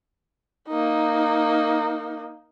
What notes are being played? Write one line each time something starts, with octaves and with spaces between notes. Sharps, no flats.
A#3 D#4